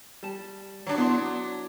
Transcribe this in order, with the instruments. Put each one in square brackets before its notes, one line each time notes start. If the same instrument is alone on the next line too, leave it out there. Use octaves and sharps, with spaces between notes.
[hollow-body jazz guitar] G3 A5
[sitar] F#3 D4
[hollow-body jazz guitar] B3 E4 C6